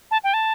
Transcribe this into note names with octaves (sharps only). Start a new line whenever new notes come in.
A5
G5
A5